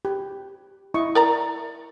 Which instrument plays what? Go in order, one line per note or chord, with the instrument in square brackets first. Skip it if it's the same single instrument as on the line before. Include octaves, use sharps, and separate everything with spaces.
[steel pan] G4
E4 D#5 C#6
[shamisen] A#4 D5 A#5